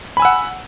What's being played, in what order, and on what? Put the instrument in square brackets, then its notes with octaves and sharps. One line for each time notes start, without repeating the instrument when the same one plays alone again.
[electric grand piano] B5
G#5
E6
F#5